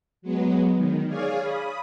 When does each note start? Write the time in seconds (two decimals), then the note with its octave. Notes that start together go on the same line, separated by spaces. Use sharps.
0.22 F#3 G#3 B3
0.73 D#3
1.08 G#4 C#5 D5 F5 G#5
1.40 B5 D#6